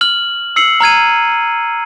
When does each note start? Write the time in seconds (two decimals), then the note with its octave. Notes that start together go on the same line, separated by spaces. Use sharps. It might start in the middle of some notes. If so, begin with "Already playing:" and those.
0.01 F6 F#7
0.56 E6 C7 C#7 F#7
0.80 A#5 F6 G#6 D#7